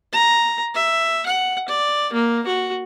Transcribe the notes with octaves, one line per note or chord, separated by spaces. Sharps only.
A#5
E5
F#5
D5
A#3
F#4